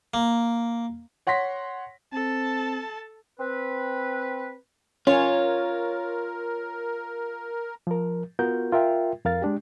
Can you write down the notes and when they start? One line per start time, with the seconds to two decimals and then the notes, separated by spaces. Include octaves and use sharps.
0.14 A#3
1.27 C#5 F#5 C6 A#6 B6
2.13 C4 A4 A5
3.40 C4 B4
5.07 C#4 F4 A#4 C#5
7.87 F3 A#4
8.39 B3 F4 F#4 A#4 G6
8.73 F4 A#4 E5 G5
9.25 F2 A#4 F5 A6
9.42 G#3 D4 G4